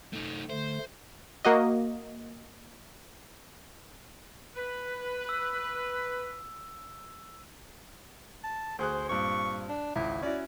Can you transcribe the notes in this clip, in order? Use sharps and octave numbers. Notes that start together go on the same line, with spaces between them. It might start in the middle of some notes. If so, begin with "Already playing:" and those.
A3 D#4
D3 A3 C5
A#3 F#4 D#5
B4
E6
A5
D2 G#4 C5 F#6
G2 A#2 C4 C#6
D4
G#1 C#2 E4
C#4 E4 F#4 D5